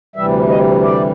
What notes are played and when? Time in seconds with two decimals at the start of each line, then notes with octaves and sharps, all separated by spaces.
0.16 D2 C3 E3 G3 E5
0.49 D#5
0.83 D5